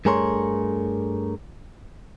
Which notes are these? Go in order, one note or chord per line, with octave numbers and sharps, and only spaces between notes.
G2 A3 G#4 A#4 C#5 C6